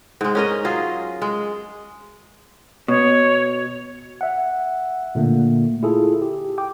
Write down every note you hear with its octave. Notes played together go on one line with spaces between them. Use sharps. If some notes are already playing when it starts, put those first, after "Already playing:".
G#2 G#3
C#4 A#4 D#5
F#3 F4 G#4
G#3
B2 C#5
E5 F#5
A#2 D3 A3 A#3
E4 F4 G#4 A4
G4
G5 D6